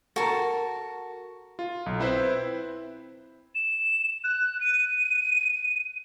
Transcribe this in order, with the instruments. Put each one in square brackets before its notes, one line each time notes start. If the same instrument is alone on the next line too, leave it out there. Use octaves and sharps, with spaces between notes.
[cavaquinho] F#4 A5 [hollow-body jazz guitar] A4 A#4
[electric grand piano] F4
B1
C4 E4 B4 C5 E5
[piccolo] E7
F#6
D#7